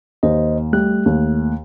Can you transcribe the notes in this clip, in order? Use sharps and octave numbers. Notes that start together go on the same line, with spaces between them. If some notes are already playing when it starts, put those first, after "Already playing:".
D#2 C5 D#5
G3 A3 F#6
D#2